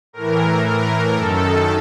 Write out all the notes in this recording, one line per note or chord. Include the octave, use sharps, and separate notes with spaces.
A2 E3 A#4
A#4
F#2 D#3 A4